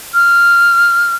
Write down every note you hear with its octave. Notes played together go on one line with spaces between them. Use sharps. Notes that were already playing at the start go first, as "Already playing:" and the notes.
F6